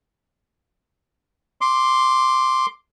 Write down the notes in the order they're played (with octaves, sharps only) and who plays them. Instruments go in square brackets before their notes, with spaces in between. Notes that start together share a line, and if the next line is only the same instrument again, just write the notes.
[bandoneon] C6 D6